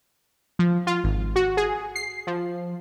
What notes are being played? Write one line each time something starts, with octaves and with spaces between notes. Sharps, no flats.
F3
F4
G#1
F#4
G#4
C7
F3